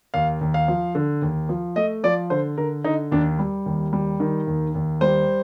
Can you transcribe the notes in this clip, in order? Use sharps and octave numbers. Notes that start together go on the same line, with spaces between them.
D#2 F5
D#2
F5
F3
D3
D#2
F3
A3 D#5
F3 D5
D3 C5
D3 A#4
D3 D#4
D#2 D4
G3
D#2
G3
D#3
D#2
D#2
G3 C5